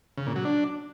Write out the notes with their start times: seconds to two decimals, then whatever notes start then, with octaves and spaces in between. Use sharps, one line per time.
0.17 C#3
0.27 A#2
0.36 F#3
0.45 D4